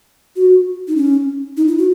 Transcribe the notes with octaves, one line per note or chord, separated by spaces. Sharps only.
F#4
D#4
C#4
D#4
E4
F#4